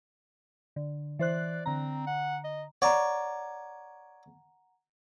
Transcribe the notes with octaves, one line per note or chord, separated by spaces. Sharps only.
D3
E3 C5 D5 F#6
D3 C4 A#5
F#5
D#5
C#5 D5 F#5 A#5